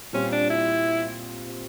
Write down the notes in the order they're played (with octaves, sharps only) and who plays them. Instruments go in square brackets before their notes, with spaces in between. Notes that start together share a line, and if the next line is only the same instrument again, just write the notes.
[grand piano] A#2 G3 C4 F4 [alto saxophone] C#4
[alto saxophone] D4
E4